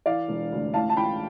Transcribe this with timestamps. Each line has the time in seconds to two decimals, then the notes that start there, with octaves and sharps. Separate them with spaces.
0.06 E3 D5 F5
0.28 E1
0.52 D2
0.74 A1 F5 A5
0.89 A5
0.97 A1 G5 B5